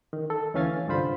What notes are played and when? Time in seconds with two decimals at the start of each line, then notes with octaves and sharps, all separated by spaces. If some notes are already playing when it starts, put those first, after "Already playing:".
0.13 D#3
0.30 A4
0.54 D2 E3 C#4 F5 G#5 A6
0.87 C2 G2 D3 F4 C5 B5